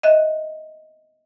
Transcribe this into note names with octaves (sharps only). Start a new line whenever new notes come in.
D#5 E5 F#6